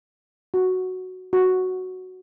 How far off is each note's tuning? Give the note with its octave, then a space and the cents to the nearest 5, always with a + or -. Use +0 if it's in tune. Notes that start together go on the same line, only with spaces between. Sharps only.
F#4 +0
F#4 +0